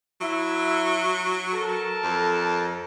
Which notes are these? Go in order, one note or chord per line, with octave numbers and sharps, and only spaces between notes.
F#3 E4 E5
A4 A#4 A5
F2